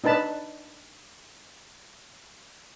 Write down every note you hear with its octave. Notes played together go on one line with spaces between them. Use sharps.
D4 D#4 B4 A5 B5